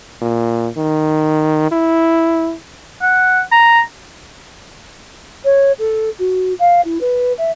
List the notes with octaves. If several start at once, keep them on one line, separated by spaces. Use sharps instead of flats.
A#2
D#3
E4
F#5
A#5
C#5
A4
F#4
F5
E4
B4
E5